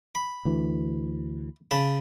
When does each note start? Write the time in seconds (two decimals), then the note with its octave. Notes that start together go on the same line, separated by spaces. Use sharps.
0.15 B5
0.45 D2 E3
1.71 C#3 A5 B5